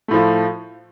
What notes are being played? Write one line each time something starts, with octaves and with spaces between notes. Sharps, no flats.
A2 F3 A3